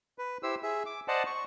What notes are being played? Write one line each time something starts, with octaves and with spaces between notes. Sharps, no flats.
B4
E4 G4 C5 E6
G#4 E5
D6
C5 D5 D#5 F#5 A5
C#6